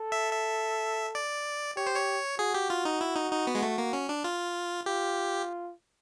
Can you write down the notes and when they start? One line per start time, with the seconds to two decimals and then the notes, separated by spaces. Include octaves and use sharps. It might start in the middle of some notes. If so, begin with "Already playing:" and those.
Already playing: A4
0.12 E5
0.32 E5
1.15 D5
1.76 G4 C#5
1.87 C5
1.96 C#5
2.39 F#4 G#4
2.54 G4
2.70 F4
2.85 D#4
3.01 E4
3.16 D#4
3.32 D#4
3.47 B3
3.55 G#3
3.62 A3
3.78 A#3
3.93 C#4
4.09 D4
4.24 F4
4.86 F4 G4